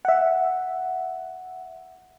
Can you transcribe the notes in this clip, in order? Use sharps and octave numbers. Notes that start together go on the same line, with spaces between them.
E5 F#5